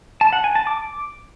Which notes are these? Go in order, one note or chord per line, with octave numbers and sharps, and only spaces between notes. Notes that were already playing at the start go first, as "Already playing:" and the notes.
A5
F#5
G#5
A5
D6